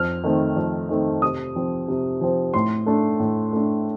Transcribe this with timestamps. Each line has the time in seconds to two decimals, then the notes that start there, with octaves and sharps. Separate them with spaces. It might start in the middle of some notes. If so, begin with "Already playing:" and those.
Already playing: F2 F6
0.24 D#3 A3 C4
0.56 F2
0.89 D#3 A3 C4
1.22 C3 D#6
1.55 F3 C4
1.88 C3
2.21 F3 C4
2.54 A2 C6
2.86 A3 D4
3.20 A2
3.53 A3 D4